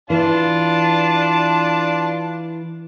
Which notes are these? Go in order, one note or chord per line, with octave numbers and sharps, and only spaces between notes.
E3 D4 F4 A5